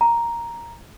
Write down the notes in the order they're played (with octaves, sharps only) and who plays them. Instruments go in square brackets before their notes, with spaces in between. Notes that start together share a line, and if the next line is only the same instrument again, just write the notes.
[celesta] A#5